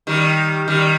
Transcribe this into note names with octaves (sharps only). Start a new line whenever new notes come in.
D#3 G3
D#3 G3